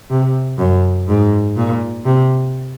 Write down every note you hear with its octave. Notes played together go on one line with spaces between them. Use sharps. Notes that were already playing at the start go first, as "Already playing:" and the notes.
C3
F#2
G#2
A#2
C3